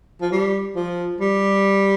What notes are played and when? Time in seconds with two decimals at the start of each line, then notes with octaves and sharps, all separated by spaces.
0.21 F3
0.32 G3
0.76 F3
1.21 G3